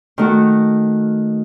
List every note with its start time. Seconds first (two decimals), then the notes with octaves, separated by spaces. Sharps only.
0.18 D#3 A3 F#4